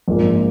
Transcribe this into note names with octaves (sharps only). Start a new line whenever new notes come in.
A#1 G#2 F3 A#3